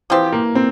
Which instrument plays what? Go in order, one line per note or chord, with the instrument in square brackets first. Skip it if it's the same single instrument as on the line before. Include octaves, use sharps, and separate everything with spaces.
[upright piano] E3 [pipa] F3 C4 G4
[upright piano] A#3
C4